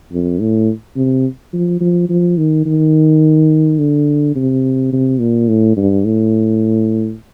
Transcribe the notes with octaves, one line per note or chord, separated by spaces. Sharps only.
F2
A2
C3
F3
F3
F3
D#3
D#3
D3
C3
C3
A#2
A2
G2
A2